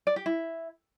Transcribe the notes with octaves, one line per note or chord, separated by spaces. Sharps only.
D5
G4
E4